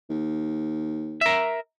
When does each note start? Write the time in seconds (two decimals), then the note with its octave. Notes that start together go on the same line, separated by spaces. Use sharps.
0.10 D#2
1.21 A#4 E5